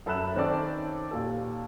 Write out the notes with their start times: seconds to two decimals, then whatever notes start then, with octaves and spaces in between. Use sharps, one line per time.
0.06 F#2 A4 E5 B5 F#6 E7
0.36 D#3 C4 C#4 A4 D5
1.11 D#2 A#2 A4